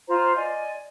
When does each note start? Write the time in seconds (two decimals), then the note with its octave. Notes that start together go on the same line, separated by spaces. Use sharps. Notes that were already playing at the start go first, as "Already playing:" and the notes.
0.09 F4 C5 A#5
0.35 D5 D#5 G#5